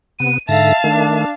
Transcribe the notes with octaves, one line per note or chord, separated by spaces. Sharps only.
C3 B3 D#7
G#2 D3 E5 F5 A5 A#6
D#3 A3 D4